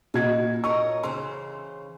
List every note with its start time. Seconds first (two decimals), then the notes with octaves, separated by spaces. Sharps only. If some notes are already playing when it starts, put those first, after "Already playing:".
0.14 A#2 D#4 E4 F#4 G#6
0.64 A#4 C#5 D#5 C#6
1.04 C#3 E3 C5 C6